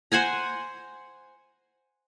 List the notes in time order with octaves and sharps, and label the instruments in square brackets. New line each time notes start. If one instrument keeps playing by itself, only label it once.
[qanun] C5 F#5 G#5 A#5